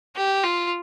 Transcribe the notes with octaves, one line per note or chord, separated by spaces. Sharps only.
G4
F4